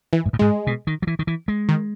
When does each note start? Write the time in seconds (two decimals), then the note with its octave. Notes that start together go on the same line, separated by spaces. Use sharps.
0.13 E3
0.26 G#2
0.33 A2
0.39 G#2 G#3
0.67 B2
0.87 D#3
1.02 F#3
1.07 E3
1.19 D#3
1.27 E3
1.48 G#3
1.69 D#3